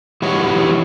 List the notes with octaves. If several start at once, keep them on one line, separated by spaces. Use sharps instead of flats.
E3 G3 D#4 F#4 C#5